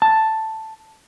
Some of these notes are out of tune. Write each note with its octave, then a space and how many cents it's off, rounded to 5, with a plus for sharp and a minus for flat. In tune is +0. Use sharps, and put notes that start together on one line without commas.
A5 +5